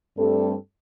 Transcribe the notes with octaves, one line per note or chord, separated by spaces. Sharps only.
G2 G3 A3 C4 A4